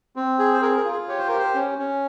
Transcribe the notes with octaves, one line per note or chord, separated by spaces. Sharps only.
C4
G#4
C5
G#4 A#4
A#4
F4
G#4
G4 C#5
C5
G4 A#4
C5
C#4
C#4